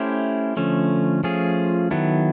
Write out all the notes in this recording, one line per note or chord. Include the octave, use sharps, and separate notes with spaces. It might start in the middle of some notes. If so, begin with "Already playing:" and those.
Already playing: A3 C#4 E4 G4 C5
D3 F3 A3 C#4
F3 A3 C#4 F4 G#4
D#3 F#3 B3 E4 A4